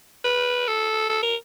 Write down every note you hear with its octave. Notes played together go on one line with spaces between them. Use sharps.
B4
A4
A4
A#4